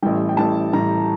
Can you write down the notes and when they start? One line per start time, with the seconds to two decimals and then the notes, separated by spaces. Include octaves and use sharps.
0.02 A1 A2 G3 G5
0.29 G5
0.37 A1 A2 G3 A5
0.72 A1 A2 G3 A#5